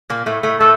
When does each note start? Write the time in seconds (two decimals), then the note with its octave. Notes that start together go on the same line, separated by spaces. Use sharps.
0.10 A#2 A#3
0.26 A2 A3
0.43 A2 A3
0.60 A2 A3 A4